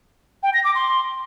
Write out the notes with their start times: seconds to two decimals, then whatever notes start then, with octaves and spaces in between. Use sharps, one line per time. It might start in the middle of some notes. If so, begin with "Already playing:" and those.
0.43 G5
0.54 A#6
0.64 D6
0.75 C6